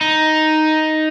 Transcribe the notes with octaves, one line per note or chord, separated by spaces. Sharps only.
D#4